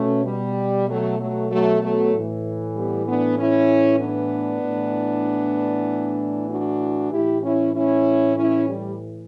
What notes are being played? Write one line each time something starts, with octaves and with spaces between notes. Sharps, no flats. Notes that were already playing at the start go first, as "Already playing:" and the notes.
Already playing: B2 A3 C#4
G3
F#3 A3
F#3 A3
F#3 A3
F#3 A3
A2 E3
G3 B3
B3 D4
C#4 E4
B3 D4
A2 E3
D4 F#4
A2 E3 E4 G4
C#4 E4
C#4 E4
C#4 E4
G3